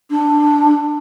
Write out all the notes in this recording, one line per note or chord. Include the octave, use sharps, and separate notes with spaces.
D4